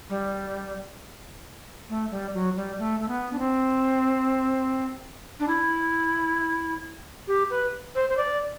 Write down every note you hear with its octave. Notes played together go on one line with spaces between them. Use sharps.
G3
A3
G3
F#3
G3
A3
A3
B3
D4
C4
D4
E4
G4
B4
C5
C5
D5